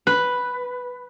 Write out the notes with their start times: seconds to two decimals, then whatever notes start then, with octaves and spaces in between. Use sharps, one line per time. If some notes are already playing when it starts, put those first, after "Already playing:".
0.07 B4